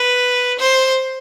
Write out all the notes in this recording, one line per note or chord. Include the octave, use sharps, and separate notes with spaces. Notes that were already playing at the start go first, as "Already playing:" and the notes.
Already playing: B4
C5